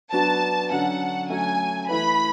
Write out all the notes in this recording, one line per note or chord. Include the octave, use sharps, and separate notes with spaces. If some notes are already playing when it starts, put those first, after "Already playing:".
F#3 B3 D4 F#4 A5
D3 F#3 C#4 F#5
F#3 A3 C#4 F#4 G#5
E3 A3 E4 B4 B5